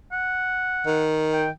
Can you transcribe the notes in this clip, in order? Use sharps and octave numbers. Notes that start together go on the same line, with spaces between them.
F#5
D#3
G5